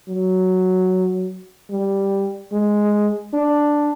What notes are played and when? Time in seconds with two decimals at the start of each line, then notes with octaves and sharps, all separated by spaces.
0.09 F#3
1.71 G3
2.52 G#3
3.33 D4